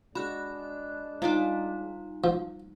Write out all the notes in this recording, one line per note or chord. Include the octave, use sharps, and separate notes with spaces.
G#3 D4 F#4 B5 F#6
G3 D#4 F4 D6
F3